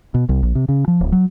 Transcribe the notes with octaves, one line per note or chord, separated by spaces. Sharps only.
B2
C2
A#1
C3
C#3
F3
D1
F#3